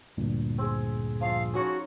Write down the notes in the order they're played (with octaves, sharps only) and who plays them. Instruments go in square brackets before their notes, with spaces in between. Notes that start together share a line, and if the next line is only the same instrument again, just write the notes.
[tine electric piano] D2 G2 A#2
[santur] C4 G#4
[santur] F3 F4 [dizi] F5
[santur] C#4 D#4 C#5 [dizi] F#4 [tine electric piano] G#5